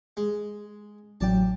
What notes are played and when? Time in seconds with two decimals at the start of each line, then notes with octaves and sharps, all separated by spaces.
0.17 G#3
1.21 A1 F#3 D5 G5 A5